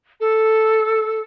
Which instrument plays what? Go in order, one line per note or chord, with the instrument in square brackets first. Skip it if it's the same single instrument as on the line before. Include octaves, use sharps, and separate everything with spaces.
[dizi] A4